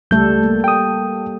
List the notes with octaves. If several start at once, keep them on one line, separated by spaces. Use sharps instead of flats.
C#2 G3 A3 A4 G6
A#3
G5 D#6